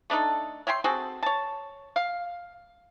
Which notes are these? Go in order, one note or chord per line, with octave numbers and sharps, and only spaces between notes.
A3 D4 D#4 A4
C#5 E5 G5 C6
C4 F#4 G#4 A4
C#5 A5
F5